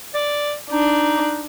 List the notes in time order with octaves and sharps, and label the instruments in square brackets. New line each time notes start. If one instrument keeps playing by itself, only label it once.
[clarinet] D5
[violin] D4 [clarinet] D#4